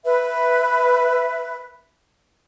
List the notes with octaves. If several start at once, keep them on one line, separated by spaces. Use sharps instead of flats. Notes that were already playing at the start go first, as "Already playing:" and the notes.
B4 E5